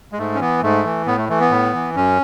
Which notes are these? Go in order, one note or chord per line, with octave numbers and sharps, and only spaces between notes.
G#3
G#2 A3
C#4
E3 B3
G#2 A3
E3
A2 B3
A3
E3 A3
B3
A2
E3
F#2 C#4